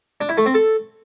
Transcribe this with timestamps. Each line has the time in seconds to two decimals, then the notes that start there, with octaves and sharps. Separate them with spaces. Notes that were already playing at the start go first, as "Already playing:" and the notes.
0.21 D4
0.29 E4
0.37 A3
0.46 C4
0.54 A4